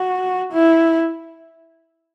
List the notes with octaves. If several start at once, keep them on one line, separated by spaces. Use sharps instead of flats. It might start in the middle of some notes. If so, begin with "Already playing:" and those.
Already playing: F#4
E4